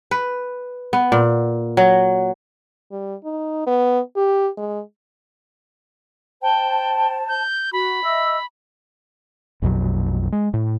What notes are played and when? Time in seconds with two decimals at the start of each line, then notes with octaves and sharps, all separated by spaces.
0.11 B4
0.93 B3
1.12 A#2
1.77 F#3
2.91 G3
3.24 D#4
3.67 B3
4.16 G4
4.57 G#3
6.42 C5 G5 A5
7.28 G6
7.73 F#4 B5
8.03 D#5 E5 E6
9.62 A#1 F2 B2 F#3
10.32 G#3
10.54 A2